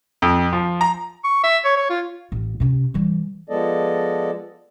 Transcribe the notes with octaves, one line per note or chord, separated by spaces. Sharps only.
F2
F3
A#5
C#6
E5
C#5
C#5
F4
A1
C3 C#4
E3 G3
F3 G#3 B3 A4 D5 D#5